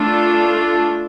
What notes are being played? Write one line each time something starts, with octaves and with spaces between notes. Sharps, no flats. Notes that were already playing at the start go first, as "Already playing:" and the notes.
Already playing: A3 D4 F4 A4